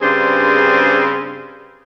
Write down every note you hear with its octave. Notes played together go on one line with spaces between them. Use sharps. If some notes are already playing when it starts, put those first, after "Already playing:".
G2 C#3 C4 D4 G#4 C5